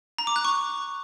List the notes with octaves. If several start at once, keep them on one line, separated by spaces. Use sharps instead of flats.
A#5
D6
F#6
C#6